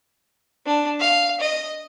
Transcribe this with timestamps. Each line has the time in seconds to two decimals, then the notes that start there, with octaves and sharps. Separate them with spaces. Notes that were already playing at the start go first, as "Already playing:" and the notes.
0.66 D4 A5
1.00 F5
1.40 D#5